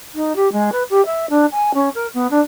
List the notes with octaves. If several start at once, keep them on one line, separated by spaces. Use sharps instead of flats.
D#4
G4
G#3
B4
G4
E5
D4
G#5
C#4
A#4
B3
D4